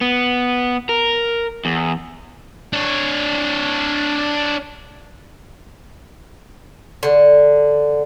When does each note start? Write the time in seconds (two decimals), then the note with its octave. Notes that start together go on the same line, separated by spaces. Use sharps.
0.01 B3
0.89 A#4
1.65 E2
2.73 D4 C#5
7.03 D3